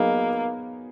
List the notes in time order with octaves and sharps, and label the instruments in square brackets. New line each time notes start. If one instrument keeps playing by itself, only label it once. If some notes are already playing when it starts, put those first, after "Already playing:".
Already playing: [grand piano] F#3 B3 D#4 G#4 [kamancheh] A#3